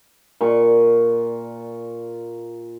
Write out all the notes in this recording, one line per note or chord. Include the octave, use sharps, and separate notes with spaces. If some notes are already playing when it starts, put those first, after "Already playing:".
A#2 C#6